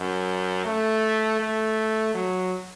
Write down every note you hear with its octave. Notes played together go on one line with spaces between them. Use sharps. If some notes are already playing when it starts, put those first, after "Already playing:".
Already playing: F#2
A3
A3
F#3